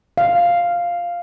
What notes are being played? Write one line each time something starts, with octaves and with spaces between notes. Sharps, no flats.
F5